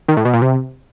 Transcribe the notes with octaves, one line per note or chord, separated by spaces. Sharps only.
D#3
A2
B2
A#2
C3